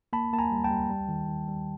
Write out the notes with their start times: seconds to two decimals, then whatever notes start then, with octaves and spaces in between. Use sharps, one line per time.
0.13 A#3 A5 B5
0.33 A#3 A5
0.39 G#5 A#5
0.51 G3
0.64 G5 A5
0.70 G3
0.90 G3
1.09 D#3
1.28 D#3
1.48 G3